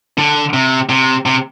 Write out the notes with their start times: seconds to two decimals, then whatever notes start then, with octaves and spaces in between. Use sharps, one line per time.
0.18 D3
0.54 C3
0.89 C3
1.26 C3